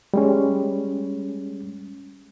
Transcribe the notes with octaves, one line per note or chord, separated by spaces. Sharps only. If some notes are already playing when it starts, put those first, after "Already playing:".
G3 G#3 C#4